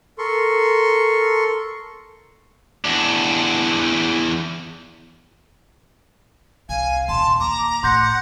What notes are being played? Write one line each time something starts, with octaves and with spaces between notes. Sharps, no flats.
A4 A#4 C6 C#6
E2 D4
C2 F5 G#5
D#1 A5 C6
D#2 A#5 D6
A2 F#5 C6 G6 A#6